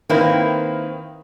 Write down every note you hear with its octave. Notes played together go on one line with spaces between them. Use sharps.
D#3 A#3 C4 E4 B4